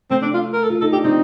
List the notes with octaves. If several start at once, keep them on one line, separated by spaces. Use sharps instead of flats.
A3 C4
D4
F4
A#4
A4
F4
D#4 A4
D4 G4
C4 D#4